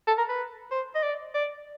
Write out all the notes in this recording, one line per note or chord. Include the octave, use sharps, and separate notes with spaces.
A4
A#4
B4
C5
D#5
D5
D5